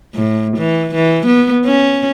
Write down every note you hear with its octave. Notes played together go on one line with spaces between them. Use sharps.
A2
E3
E3
B3
C#4